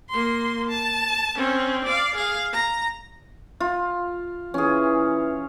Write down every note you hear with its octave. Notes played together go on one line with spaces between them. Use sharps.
A#3 C6
A5
C4 C#4
D5 F5
G#4 F5
A#5
F4
E3 C#4 G#4